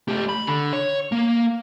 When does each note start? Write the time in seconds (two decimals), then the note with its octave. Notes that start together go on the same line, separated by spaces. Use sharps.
0.08 A3 G4
0.29 B5
0.47 D3
0.73 C#5
1.12 A#3